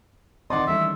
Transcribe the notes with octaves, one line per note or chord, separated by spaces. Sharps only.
D#3 C4 D5 D#5 F#5 C6
D#3 E3 G3 A3 C#4 E5